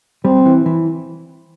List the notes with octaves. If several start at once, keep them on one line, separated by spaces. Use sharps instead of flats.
G3 C4
E3
E3